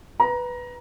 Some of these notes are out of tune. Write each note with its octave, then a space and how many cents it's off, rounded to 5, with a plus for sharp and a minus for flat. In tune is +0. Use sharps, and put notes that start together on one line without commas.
B4 +0 A#5 +20